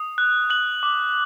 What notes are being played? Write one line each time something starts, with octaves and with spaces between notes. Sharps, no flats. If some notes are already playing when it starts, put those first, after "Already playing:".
Already playing: D#6
F#6
F#6 F#7
D6